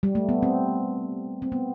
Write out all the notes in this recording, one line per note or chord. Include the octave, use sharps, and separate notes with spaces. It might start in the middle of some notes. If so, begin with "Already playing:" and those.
G3
A3
B3
C4
C4
B3